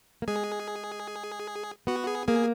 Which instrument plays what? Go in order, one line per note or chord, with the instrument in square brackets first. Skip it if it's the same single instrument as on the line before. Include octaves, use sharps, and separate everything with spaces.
[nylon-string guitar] A#3
[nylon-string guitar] G#3 [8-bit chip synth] G#4
[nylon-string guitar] B3 [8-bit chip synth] F#4
[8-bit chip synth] G#4
[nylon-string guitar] A#3 [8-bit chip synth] G#4